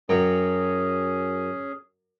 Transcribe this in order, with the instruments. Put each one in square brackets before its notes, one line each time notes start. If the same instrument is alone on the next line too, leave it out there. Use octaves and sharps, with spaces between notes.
[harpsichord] F#2 F#3 G5 [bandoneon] C#4 G#4